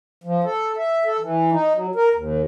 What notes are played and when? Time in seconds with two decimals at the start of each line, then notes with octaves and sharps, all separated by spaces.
0.24 F3
0.44 A4
0.77 E5
1.05 A4
1.20 E3
1.52 D#4
1.73 F#3
1.95 A#4
2.15 D#2